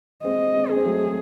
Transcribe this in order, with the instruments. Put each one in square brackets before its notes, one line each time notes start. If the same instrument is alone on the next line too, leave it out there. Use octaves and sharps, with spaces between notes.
[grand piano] G#3 C4 [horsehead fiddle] D#5
[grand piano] G#3 C4
[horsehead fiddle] G#4
[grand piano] C4
F#3 A3